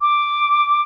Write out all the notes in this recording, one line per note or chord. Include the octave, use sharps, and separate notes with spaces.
D6